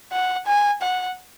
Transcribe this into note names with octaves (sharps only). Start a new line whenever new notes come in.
F#5
G#5
F#5